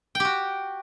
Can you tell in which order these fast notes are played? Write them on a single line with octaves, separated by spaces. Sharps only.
G5 G4 F#4